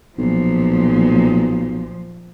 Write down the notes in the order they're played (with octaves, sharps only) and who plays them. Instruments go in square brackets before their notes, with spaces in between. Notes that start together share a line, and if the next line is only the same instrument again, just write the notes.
[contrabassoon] B1 [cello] A#2 F3